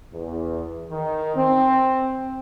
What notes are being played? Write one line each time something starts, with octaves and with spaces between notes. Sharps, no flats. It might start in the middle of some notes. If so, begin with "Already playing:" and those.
E2
D#3
C4